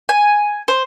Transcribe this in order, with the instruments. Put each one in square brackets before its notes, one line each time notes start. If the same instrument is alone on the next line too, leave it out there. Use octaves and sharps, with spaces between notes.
[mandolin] G#5
C5